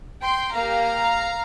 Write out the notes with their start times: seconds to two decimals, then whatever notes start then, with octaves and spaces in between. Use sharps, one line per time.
0.22 G5 C6
0.55 A#3 G4 F5 A#5